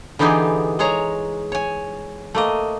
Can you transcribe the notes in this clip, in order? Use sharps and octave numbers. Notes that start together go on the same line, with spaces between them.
D3 E3 B3 D#4 G4 G#4
G#3 G#4 C#5 A#5
C#5 G#5
A3 A#3 D#5